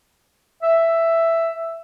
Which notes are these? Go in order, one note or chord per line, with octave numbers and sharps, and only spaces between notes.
E5